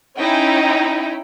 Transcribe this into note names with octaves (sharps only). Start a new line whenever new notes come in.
C#4 D#4 E4 G5